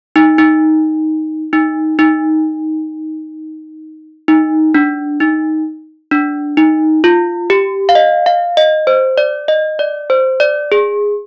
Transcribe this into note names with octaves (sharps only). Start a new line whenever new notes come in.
D#4
D#4
D#4
D#4
D#4
D4
D#4
D4
D#4
F4
G4
F5
D#5
F5
D#5
C5
D5
D#5
D5
C5
D5
G#4